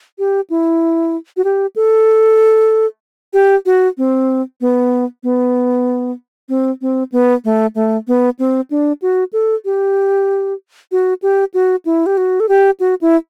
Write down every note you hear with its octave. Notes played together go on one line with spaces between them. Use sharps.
G4
E4
F#4
G4
A4
G4
F#4
C4
B3
B3
C4
C4
B3
A3
A3
B3
C4
D4
F#4
A4
G4
F#4
G4
F#4
E4
G4
F#4
A4
G4
F#4
E4